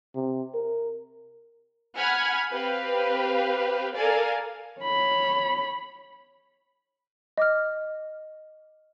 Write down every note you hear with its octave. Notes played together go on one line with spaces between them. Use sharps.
C3
A#4
F#5 G#5 B5 F6 G#6
C4 G4 B4 F5
A4 A#4 D5 F5 G#5
C#5 B5
D#5 D6 F6